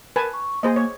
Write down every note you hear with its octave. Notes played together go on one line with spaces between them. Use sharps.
A#4 B4 G#5 A5
C#6
A#3 G#4 C5 D#5
C#5